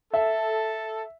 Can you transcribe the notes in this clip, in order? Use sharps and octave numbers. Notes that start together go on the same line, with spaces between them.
A4 E5